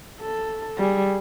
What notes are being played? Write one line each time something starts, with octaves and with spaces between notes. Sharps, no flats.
A4
G3 G#4